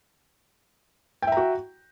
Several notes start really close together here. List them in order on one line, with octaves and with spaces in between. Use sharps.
G5 E5 A#5 F#4